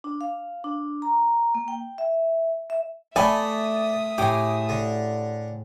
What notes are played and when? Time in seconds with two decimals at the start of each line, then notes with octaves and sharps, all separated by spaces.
0.04 D4
0.21 F5
0.64 D4
1.02 A#5
1.55 A#3
1.68 G5
1.98 E5
2.70 E5
3.16 A3 A4 D5 E5 G#5 B5 D#6
4.18 A2 G4 G#4 D6
4.69 D3